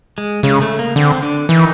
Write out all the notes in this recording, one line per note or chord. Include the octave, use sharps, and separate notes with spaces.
G#3
C#3 G#3
A3
A#3
D3 C4
D3 D4
D#3 E3 D#4